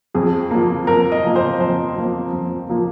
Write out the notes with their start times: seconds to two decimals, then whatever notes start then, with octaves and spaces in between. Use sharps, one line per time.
0.14 F2 G#4
0.51 F3 A#3
0.87 F2 A#4
1.12 D#5
1.24 F3 A#3
1.36 C5
1.60 F2 C5
1.96 F3 A#3
2.33 F2
2.69 F3 A#3